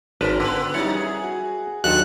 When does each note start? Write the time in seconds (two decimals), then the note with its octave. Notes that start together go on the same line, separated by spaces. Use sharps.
0.21 G#1 G3 C#4 A#4 B4 A5 B6
0.40 D3 B3 B4
0.74 F#3 G3 C#4 D#4 E4 C#5 F#5
0.93 G#4
1.23 F#4
1.84 D#2 F#3 D4 F4 F#4 A4 F#6